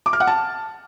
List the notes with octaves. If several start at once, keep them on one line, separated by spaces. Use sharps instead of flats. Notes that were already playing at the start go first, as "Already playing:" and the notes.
D6
F6
F#5
A5